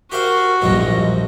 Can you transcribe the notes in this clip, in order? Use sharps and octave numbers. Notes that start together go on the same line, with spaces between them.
F#4 G4 A#4 C5 F5
A#1 E2 G2 F#3 D#5